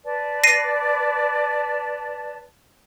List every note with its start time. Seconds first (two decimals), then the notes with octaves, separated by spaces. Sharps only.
0.05 B4 D5 A5
0.44 A#6 C7 D#7